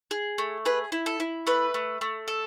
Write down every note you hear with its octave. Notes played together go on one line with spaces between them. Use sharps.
G#4
A3
G#4 B4
E4
A4
E4
A3 B4
A3
A3
A4